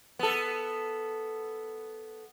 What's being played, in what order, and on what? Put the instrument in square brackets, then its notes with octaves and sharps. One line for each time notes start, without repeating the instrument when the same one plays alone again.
[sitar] B3 A4